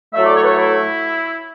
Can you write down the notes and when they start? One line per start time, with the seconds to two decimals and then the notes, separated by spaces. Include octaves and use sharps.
0.14 A2 F#3 A3 E5
0.25 D5
0.36 C#5
0.43 B4
0.46 C#5
0.58 E4